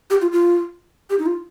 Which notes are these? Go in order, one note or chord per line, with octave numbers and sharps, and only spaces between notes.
G4
F4
F4
G4
D#4
F4